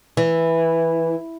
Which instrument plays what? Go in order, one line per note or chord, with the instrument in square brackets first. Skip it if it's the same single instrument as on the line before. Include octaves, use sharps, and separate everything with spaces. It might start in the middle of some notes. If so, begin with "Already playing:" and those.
[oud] E3